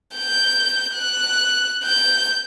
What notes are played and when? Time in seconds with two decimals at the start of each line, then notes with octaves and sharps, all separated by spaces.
0.16 G6
0.94 F#6
1.84 G6